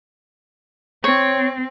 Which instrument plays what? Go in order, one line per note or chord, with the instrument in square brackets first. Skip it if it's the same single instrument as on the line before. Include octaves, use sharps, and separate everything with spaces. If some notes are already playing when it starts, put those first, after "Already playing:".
[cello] C4 [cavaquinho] C#5